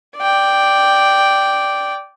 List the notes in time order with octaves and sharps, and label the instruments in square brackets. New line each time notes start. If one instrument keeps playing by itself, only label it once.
[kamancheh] D5 G5